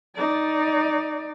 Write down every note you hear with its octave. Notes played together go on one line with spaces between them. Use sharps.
D#4 D5